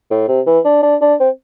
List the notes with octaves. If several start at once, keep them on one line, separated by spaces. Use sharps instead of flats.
A2
C3
E3
D4
D4
D4
C4